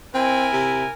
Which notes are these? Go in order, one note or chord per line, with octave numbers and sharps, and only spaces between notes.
C4 E4 A#4 G#5
C3